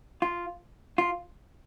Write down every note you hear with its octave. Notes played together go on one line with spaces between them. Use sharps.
F4
F4